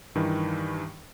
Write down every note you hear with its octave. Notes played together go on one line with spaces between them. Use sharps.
G2 D#3 E3